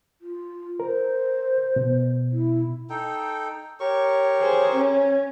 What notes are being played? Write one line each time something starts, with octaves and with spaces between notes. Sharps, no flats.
F4
A#4 C5
B2
E4
D#4 A4 G5
G4 A#4 C#5 C#6
G#4 C5
C#4 C#5